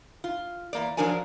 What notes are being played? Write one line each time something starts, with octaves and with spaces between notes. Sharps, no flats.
F4
E2 A#3 D5
F3 F#3 D4 A#4 D5 G#5